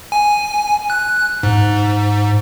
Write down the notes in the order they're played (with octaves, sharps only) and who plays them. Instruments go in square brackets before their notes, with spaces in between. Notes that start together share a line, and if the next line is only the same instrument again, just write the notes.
[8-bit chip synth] G#5
F#6
G#2